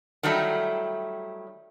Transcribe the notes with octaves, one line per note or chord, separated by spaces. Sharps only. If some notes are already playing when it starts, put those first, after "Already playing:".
D#3 F#3 G3 A3 E4